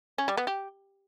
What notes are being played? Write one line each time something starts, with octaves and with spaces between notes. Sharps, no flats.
C#4
G3
B3
G4